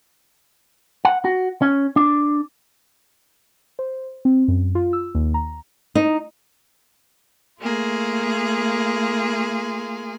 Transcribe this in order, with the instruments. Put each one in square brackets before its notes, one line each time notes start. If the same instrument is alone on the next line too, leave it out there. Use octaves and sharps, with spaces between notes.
[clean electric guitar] F#5
F#4
C#4
D4
[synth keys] C5
C4
F#2
F4
E6
D#2
A#5
[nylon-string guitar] D#4
[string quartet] A3 A#3 F4 G#4